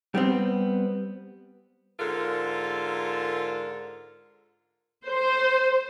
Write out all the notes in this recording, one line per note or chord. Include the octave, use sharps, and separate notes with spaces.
G3 B3 C4
G#2 D3 F4 A4 A#4
C5